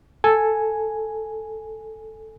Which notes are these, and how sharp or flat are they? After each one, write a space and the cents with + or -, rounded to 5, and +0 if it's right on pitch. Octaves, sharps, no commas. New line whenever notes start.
A4 +0 G#5 +0